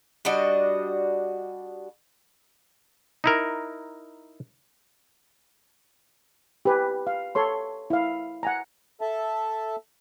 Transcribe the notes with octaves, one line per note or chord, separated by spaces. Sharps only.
G3 D4 F#4 D#5
D#4 E4 A#4
G4 B4 G#5
F5
A4 C#5 C6
E4 F5
F#5 G#5 A#5
A4 E5 A5